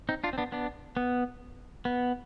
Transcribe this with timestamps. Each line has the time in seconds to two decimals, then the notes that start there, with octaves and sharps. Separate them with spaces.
0.09 C4 D#4
0.24 D4 F4
0.33 C4
0.38 B3 D4
0.52 B3 D4
0.97 B3
1.85 B3